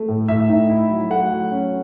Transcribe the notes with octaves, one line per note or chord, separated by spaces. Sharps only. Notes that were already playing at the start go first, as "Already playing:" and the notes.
Already playing: A3
A2
A2 E5
D#4
E4
F#3
A3 F#5
F#3
C#4